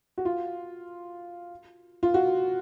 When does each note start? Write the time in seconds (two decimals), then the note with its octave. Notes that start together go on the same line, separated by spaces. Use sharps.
0.18 F#4
0.25 F4
2.03 F4
2.14 F#4